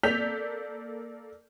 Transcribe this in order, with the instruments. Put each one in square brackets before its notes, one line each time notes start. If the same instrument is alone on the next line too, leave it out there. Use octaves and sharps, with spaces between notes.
[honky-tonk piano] A#3 A4 D5 G6 B6 F7